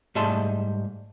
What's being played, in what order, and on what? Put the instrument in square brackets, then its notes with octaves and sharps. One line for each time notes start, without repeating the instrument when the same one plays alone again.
[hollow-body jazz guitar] G#2 G3 A3 G#4 A5 C6